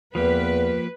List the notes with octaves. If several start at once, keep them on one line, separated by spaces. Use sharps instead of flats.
E2 F3 A#3 G4 B4